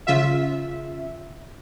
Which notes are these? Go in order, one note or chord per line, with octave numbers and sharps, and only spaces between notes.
C#3 F4 E5